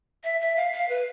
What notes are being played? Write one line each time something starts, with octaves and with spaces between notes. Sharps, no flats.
E5
E5
F5
F5
B4